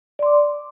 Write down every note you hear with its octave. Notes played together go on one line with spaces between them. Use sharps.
D5 C6 D6